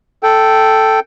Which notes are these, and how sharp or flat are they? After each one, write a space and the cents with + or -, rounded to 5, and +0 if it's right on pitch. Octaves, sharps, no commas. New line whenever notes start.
A4 +0 G5 -5